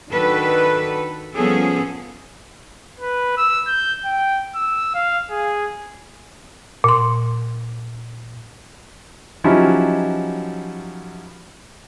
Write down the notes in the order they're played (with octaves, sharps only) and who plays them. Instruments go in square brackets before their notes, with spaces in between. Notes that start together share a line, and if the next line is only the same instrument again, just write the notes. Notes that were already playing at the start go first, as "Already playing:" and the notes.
[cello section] D#3 D4 F#4 A4 B4
F3 G3 B3 C#4 G#4 A4
[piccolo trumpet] B4
E6
G6
G5
E6
F5
G#4
[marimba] A#2 C6
[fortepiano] F3 F#3 C#4 D#4 E4 G4